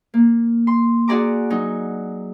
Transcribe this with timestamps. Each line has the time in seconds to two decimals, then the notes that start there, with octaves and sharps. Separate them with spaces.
0.14 A#3
0.67 C6
1.08 F#4 G#4 D5 A#5 D6
1.50 F#3 D#4